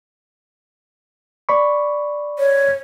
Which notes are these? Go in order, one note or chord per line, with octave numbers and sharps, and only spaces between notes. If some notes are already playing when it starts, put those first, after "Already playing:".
D5 B5 C#6
C#5